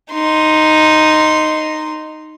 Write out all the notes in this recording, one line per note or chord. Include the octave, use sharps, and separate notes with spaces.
D#4 C6